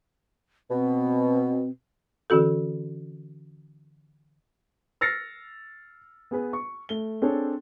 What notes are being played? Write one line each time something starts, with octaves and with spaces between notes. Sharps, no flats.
B2 C4
D3 E3 C#4 F#4 A4
E6 F6 A6 A#6 C7 C#7
B3 G#4 B4
C#6
A3 G7
C4 D4 G#4 A4 C5 C#5